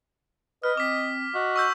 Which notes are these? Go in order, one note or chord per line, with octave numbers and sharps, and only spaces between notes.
B4 D#5 F6
C4 D6 B6
F#4 D#5
C#6 E6 G6